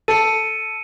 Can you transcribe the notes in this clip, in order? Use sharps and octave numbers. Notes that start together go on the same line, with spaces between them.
A4 C#7 D#7